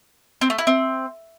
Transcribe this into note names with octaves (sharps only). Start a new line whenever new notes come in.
C4
A3
E4
C4